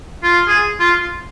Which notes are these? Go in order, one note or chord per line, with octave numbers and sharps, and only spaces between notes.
F4
G#4
F4